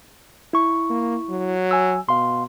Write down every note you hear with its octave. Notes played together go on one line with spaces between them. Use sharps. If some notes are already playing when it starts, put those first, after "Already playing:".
E4 C#6
A#3
F#3
G#5 E6
B2 F5 C6